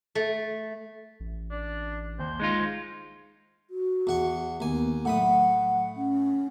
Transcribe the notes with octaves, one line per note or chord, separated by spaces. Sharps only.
A3
A1
D4
D#2 C5
G#3 D#4 F4
F#4
E2 F#5 C#6
D#2 B3 G#5
A2 F#3 F#5 B5 D#6
C#4